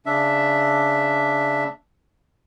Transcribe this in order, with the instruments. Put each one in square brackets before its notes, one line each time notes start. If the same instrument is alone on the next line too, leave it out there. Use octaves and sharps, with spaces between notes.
[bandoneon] C#3 D4 E5